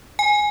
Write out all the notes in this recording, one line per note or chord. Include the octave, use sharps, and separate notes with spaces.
G#5